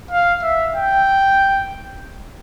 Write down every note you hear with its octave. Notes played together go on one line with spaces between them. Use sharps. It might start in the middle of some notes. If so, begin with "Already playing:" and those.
F5
E5
G5